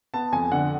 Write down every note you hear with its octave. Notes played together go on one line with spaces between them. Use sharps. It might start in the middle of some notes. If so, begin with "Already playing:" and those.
B3 A5
F2 G#5
D3 F#5